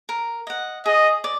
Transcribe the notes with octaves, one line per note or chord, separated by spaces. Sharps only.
A#4
D#5 F#5
G#4 D#5
D5